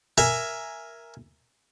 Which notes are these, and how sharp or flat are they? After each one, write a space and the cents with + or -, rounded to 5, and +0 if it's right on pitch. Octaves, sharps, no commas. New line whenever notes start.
A#4 +5 E5 +10 G#5 +0